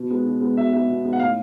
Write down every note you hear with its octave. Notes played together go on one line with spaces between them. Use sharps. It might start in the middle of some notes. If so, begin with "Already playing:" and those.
Already playing: B2
G#3 B3
B2
G#3 B3
B2 E5
G#3 B3 E5
B2
G#3 B3
F#5
A2 F5